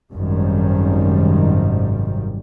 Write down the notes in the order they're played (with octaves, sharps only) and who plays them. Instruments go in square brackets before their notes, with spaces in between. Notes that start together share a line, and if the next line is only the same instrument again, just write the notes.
[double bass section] G#1 F#2 C3 D#3 G3